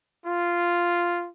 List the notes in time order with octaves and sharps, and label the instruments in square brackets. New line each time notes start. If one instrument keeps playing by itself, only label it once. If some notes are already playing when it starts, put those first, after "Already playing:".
[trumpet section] F4